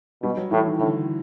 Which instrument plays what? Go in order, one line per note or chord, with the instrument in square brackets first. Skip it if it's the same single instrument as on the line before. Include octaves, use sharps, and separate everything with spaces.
[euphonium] B2 [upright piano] G3
[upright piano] F#3
[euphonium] A2 [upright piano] E3
[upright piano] D#3
[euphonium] A2 [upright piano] D3